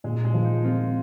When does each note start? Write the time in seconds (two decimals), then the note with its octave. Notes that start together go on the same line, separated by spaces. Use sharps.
0.04 A#2 G#3
0.25 G#3
0.34 F3
0.44 D#4
0.64 C4 F4